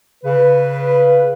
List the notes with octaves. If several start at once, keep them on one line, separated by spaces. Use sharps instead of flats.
C#3 B4